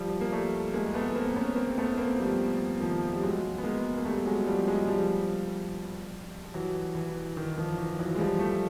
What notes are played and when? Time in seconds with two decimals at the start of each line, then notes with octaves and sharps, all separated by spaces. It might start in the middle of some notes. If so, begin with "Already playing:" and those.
Already playing: F3 G3
0.21 A#3
0.32 G3 A3
0.73 G#3 A#3
0.94 A3 B3
1.15 A#3 C4
1.36 B3 C#4
1.56 A#3 C4
1.78 A3 B3
1.97 A#3 C4
2.18 F3 G3
2.80 D#3 F3
3.11 G3
3.23 F#3 G#3
3.58 B3
3.63 G#3 A#3
3.97 A#3
4.05 G3 A3
4.26 F#3 G#3
4.47 F3 G3
4.67 F#3 G#3
4.88 F3 G3
6.54 E3 F#3
6.95 E3
7.37 D#3
7.57 D#3 F3
7.77 E3
7.99 E3 F#3
8.15 G#3
8.19 F3 G3
8.39 G3 A3